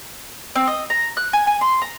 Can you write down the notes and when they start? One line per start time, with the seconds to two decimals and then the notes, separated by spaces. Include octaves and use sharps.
0.56 C4
0.67 D#5
0.90 A#5
1.17 F#6
1.33 G#5
1.47 G#5
1.61 C6
1.82 A#5